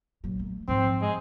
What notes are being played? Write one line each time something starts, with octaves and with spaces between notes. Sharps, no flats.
A#1 F#3
F#3 A3
G#2 F3 C4
G#3